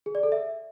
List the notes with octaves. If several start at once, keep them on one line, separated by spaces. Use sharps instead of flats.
G#4
D5
A4
E5